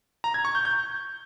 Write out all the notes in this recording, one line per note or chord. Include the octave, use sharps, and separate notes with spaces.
A#5
G#6
C#6
G6
G6